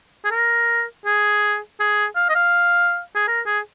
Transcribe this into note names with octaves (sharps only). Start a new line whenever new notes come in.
G#4
A#4
G#4
G#4
F5
D#5
F5
G#4
A#4
G#4